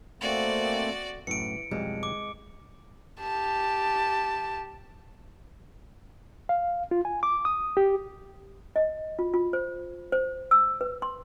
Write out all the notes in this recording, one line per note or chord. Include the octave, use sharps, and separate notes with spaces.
A3 A#3 C4 F#4 D5
F#2 A2 E3 C#7 D7
B1 F2 G3 G#3
D6
G4 A5
F5
F4
G#5
D6
D#6
G4
D#5
F4
F4
C5
C5
E6
B4
C6